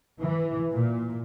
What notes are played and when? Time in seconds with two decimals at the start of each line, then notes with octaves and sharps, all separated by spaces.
0.21 E3
0.73 A#2